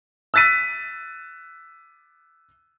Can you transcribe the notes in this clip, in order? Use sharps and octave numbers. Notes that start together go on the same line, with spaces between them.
E6 F#6 A6 B6 D#7